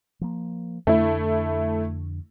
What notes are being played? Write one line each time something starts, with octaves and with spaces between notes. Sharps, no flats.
F3 A#3
F2 D3 A3 D4 E4